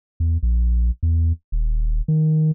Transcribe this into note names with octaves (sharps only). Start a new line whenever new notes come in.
E2
A#1
E2
D#1
D#3